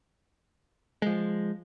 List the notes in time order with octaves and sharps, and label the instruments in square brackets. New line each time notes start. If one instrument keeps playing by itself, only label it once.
[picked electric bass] F3 G#3